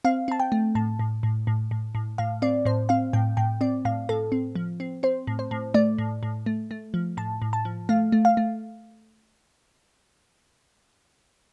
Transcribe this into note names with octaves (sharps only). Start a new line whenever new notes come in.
C4 F5
C4 A5
G5
A3
A2 A5
A2
A2
A2
A2
A2
A2 F5
C4 D5
A2 C5
C4 F5
A2 G5
A2 G5
C4 D5
A2 F5
A2 A4
C4
F3
C4
C4 C5
A2
C5
A2
A3 D5
A2
A2
A3
A3
F3
A2 A5
A2
A5
F3
A3 F5
A3
F5
A3